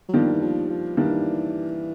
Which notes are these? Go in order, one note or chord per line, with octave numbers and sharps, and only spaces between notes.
F#3
D#3 F3 G3 A#3 D4 G4
E3
F3
F3
D#3 E3 G3 A#3 D4 G4